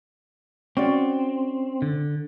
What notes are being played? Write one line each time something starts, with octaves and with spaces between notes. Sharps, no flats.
C4 C#4 F#4 D5
D3